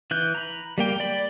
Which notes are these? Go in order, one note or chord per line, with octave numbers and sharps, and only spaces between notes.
E3 F#6 G6
A#5 B5
G3 A#3 G5
D5 B5